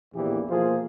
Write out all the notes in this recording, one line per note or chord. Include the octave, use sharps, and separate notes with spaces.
A#1 E2 A#2 E3 G4 G#4
B2 F3 A#3 F4 G#4 C5